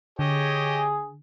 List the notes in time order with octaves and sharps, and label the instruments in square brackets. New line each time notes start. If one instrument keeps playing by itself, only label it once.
[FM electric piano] D3 [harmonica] G4 C#5 D#5 [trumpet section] G#4